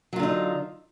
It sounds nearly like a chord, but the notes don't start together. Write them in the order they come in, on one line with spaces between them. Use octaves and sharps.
F#3 F4 D3 D#4